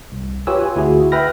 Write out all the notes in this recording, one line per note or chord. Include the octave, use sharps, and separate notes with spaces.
C2
F4 G4 B4 C#5 G#5 E6
F4 G#5
D2 E4 F#4 G#4
B4 E5 G5 B5 F6 A#6